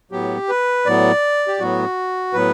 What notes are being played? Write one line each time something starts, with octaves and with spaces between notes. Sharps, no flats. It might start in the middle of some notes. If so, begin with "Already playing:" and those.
A2 F#3 B3 G4
B4
A2 F#3 B3 D5
G4
A2 F#3 B3 F#4
A2 F#3 B3 B4